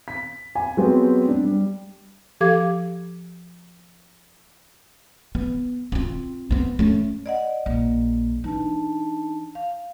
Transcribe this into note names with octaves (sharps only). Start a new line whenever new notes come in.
B6
G#5
F#3 G#3 B3 C4 G4
D4
G3
F3 G4 A4 F5 D6 G#6
B3
C4 F4
B3 C4
A3 C#4
D5 D#5 F#5
A#1 A#3
E3 D4 D#4 A5
F5